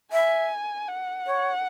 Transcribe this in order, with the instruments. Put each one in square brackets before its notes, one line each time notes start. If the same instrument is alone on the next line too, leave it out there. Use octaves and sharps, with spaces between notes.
[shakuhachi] E5 [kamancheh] G#5
[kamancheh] F#5
[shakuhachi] C#5